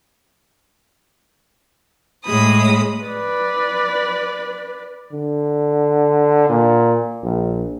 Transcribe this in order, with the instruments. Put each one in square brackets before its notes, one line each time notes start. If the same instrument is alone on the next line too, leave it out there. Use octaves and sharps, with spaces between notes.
[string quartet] A2 G#3 B5 D#6
[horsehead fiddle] B4 D5
[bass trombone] D3
A#2
A#1